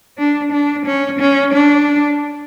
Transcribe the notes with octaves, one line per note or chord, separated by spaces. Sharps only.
D4
D4
C#4
C#4
D4